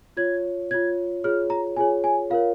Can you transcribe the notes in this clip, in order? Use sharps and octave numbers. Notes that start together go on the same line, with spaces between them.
F4 C#5 G#6
F4 C#5 G#6
F4 G#4 C#5 F6
A#5
F4 G#4 C#5 G#5
G#5
F4 A#4 C#5 F5